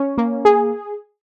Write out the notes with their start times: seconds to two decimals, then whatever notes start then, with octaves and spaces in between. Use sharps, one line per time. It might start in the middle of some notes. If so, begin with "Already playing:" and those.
Already playing: C#4
0.18 A#3
0.45 G#4